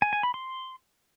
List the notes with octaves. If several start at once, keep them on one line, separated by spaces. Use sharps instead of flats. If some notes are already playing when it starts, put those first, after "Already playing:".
G#5
G#5
B5
C6